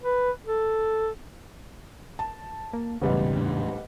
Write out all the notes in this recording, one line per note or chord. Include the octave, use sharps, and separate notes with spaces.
B4
A4
A5
A#3
E1 A1 G#2 C#3 G3 B3
E2 A2 D4